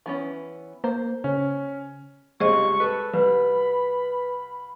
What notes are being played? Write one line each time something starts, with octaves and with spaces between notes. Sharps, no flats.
E3 B3 C#4
A#3 C5
C#3 C#4
C#2 G2 C3 G#4 C5 D#5 C#6
A4 B4
C2 B4 B5